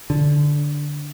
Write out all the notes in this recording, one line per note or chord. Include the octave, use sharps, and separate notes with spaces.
D3